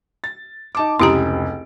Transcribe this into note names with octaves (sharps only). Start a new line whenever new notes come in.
A6
D#4 A5 D6
F1 C#2 E4 G4 A#5 D7